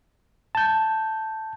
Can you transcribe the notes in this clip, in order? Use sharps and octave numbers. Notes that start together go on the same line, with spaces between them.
A5 G6